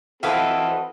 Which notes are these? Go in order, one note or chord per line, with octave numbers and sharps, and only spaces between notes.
E3 C4 F#4 A4 B4 D#5 F5